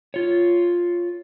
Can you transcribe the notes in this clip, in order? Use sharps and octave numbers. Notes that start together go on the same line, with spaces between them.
F4 C#5